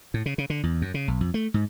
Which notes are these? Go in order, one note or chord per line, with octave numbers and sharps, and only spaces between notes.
A2
C#3
C#3
D3
E2
F#2
C#3
B1
F2
A3
G#2